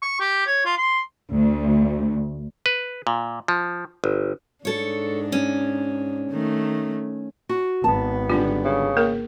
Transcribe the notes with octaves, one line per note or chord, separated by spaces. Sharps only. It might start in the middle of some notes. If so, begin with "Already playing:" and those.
C#6
G4
C#5
F4
C6
D2
B4
A#2
F3
G1
G#2 D4 A4 C#5
C#4
D#3 A3
F#4
G#1 B3 A5
D3 G3 D4 F4 G4
C#3
A#3 G#4 A#4